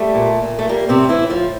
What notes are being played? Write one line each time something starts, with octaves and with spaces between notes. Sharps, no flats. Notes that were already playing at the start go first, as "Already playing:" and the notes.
Already playing: G3 A3
A#2
A#2
A3
G3 A#3
C3 C4
A2
E3 E4
A2
F3 F4